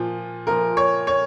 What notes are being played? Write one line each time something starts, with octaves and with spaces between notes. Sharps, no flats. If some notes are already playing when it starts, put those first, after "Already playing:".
Already playing: A#2 F3
A#2 F3 A#4
C#5
C#5